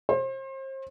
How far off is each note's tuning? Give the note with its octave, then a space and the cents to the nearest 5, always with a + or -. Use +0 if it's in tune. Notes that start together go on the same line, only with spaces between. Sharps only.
C5 +35